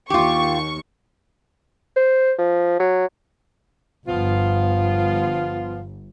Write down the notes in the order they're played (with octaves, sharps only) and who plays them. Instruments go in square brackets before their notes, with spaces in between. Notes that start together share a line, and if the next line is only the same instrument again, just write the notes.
[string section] D#2 C#6 [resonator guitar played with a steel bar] F4 G4
[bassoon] C5
F3
F#3
[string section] G1 [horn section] F3 B3 F4